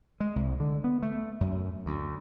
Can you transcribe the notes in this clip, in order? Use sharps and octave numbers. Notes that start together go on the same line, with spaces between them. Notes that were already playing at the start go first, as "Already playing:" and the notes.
G#3
C2
D3
B3
A3
F#2
D2